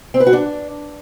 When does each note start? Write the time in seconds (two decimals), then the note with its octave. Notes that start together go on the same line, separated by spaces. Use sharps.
0.14 C4
0.20 B4
0.27 F#4
0.33 D4